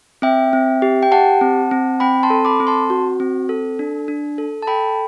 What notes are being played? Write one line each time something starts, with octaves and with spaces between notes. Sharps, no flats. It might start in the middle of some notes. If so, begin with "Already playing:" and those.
C4 E5 G5
C4
G4
G5
G4 F#5 A5
C4
C4
C4 G5 B5
A5 C6
A4
B5 D6
C4
A5 C6
F#4
C4
A4
D4
D4
A4
A5
A4 G5 B5